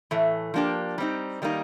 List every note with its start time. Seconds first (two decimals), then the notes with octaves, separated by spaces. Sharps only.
0.11 A2 E3 A3
0.54 F3 A#3 D4 G4
0.98 G3 C4 D#4
1.42 D#3 G3 A#3 D#4